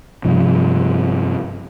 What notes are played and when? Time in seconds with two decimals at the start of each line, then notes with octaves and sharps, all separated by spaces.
0.25 G2 C3 F3